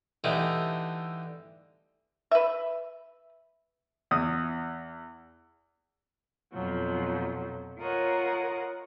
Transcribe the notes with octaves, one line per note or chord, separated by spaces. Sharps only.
D3 E3 G3 A3 D#4
B4 E5
E2 D#6
F2 B2 F3 F#3
F4 A#4 C#5 D#5 F#5